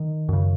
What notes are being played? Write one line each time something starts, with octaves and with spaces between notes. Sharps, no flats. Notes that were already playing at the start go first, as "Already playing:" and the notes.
Already playing: D#3
F#2 C#3